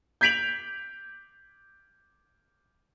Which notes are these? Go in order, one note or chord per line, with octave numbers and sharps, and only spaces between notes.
G6 G#6 B6 D7 F7 F#7